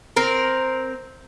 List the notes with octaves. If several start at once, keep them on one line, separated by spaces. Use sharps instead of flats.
C4 A#4